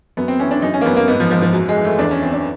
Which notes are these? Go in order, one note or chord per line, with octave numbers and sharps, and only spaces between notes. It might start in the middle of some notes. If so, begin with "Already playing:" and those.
F#2 B3
C4
E3 C#4
D4
F#2 D#4
C#4
A#3
F#2 B3
A#3
G#2 B3
F3
G#2 F3
F3
F#2 F#3
G#3
E3
A3
E2 D4
C#4
E3 C4
D4